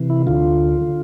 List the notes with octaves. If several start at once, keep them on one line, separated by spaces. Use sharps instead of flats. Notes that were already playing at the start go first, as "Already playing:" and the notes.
Already playing: C3 E3
E4
D2 D3 F4
D3